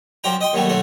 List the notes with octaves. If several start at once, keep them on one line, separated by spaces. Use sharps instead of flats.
F#2 F3 D5 G5 A#5
D#5 G5 C6
D#2 F#3 G3 A3
B1 F#3 A3